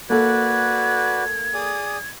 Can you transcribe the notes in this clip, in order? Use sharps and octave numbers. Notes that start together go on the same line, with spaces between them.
A#3 F#4 A4 B4 D5 G#6
G#4 D5 D#6